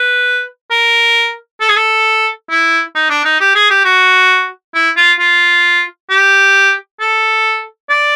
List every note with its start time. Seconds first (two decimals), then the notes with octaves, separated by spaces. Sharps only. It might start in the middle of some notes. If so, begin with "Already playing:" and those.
Already playing: B4
0.71 A#4
1.61 A4
1.69 G#4
1.76 A4
2.50 E4
2.95 D#4
3.10 D4
3.25 D#4
3.40 G4
3.55 G#4
3.70 G4
3.85 F#4
4.74 E4
4.97 F4
5.20 F4
6.10 G4
7.00 A4
7.90 D5